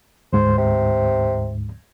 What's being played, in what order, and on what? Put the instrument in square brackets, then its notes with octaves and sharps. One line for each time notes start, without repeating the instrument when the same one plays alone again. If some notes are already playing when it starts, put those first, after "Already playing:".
[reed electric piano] D2 G#2 [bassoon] C5
[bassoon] C3